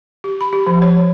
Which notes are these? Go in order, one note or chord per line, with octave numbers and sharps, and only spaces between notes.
G4
B5
G4
F3
C#5